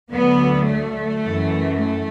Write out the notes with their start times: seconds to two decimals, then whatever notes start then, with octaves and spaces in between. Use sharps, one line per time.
0.12 D2 D3 F#3 B3
0.67 A3
1.21 F#2 E3
1.77 A3